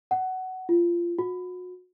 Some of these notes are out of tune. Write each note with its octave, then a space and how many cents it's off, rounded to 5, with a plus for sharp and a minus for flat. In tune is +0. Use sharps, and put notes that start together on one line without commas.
F#5 +15
F4 -20
F#4 -35